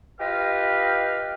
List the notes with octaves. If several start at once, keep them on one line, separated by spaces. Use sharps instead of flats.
F4 G4 B4 D#5 F5 G5